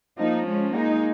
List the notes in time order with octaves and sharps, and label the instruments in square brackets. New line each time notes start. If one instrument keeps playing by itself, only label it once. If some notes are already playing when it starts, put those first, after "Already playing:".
[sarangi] F3 [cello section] A#3 D#4
[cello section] G#3 C#4
[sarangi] G#3 [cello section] A#3 D#4